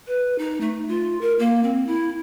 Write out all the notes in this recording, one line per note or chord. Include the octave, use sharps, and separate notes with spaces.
B4
D#4
A3
F4
A#4
A#3
C4
E4